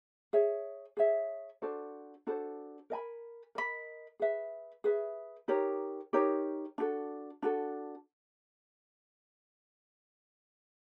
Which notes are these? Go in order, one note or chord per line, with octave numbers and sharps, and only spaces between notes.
G#4 C#5 E5
G#4 C#5 E5
D4 F#4 A4 C5
D4 F#4 A4 C5
A#4 D#5 G#5 B5
A#4 D#5 G#5 B5
G#4 B4 E5
G#4 B4 E5
D#4 G4 A#4 C#5
D#4 G4 A#4 C#5
D4 F#4 A4
D4 F#4 A4